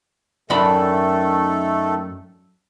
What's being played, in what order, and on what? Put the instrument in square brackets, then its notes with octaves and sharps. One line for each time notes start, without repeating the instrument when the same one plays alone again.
[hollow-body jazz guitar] F#2 D4 B5 [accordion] D#3 A3 A4